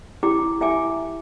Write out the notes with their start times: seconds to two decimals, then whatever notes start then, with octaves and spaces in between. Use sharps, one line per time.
0.23 E4 G4 G5 D6
0.61 E4 E5 G5 G#5 D6